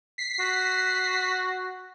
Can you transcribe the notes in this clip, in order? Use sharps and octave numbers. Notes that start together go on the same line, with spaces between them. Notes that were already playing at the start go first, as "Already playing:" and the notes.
B6 C7
F#4